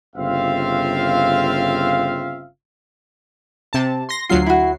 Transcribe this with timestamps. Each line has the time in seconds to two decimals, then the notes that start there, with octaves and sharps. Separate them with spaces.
0.16 G1 C#3 C4 F4 E5 F5
3.73 C3 A5
4.09 C6 A#6
4.29 D2 F#3 F4 C7
4.46 E4 F#4